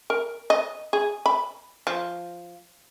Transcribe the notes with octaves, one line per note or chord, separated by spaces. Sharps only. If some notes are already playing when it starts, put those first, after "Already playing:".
A#4
D#5
G#4
B5
F3